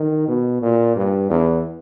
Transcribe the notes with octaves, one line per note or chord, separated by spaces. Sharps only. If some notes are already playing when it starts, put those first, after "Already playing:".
Already playing: D#3
B2
A#2
G2
E2